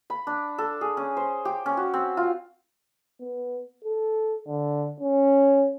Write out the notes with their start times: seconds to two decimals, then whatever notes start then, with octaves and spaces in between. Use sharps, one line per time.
0.10 B5
0.27 D4
0.58 A4
0.81 G#4
0.97 C#4
1.17 C5
1.45 G4
1.66 C#4
1.77 F#4
1.94 C4
2.17 F4
3.20 B3
3.84 A4
4.47 D3
5.00 C#4